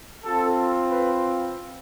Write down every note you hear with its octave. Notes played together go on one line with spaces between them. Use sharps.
C4 F4 A4
B4